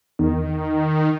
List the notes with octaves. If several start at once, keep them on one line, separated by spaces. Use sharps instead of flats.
E2 D#3